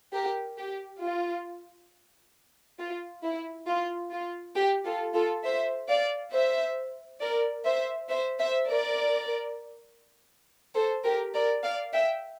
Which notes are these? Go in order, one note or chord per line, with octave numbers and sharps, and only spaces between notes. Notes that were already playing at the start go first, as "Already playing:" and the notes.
G4 A#4
G4
F4
F4
E4
F4
F4
G4
F4 A4
F4 A4
C5 E5
D5 F5
C5 E5
A#4 D5
C5 E5
C5 E5
C5 E5
A#4 D5
A4 C5
G4 A#4
A#4 D5
D5 F5
E5 G5